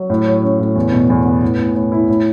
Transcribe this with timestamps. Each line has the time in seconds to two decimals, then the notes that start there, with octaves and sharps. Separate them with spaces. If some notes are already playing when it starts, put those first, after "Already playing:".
Already playing: F#3
0.10 A2
0.27 F#3
0.43 C#4
0.60 A2
0.75 E2
0.92 B2
1.10 E2
1.25 B3
1.42 A2
1.58 A2
1.75 A2
1.92 E4
2.08 A2